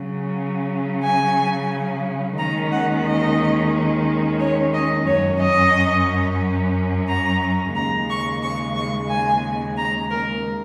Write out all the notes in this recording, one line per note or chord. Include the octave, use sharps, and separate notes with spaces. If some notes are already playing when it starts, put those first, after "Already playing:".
Already playing: C#3 F#3 C#4
G#5
D#2 D#3 G#3 C#4 A#5
F#5
D#5
C#5
D#5
F#2 F#3 C#4 C#5
D#5
A#5
D#2 C#3 G#3 A#5
C#6
C#6
C#6
G#5
A#5
A#4